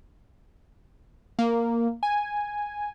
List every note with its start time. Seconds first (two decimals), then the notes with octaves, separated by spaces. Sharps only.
1.39 A#3
2.03 G#5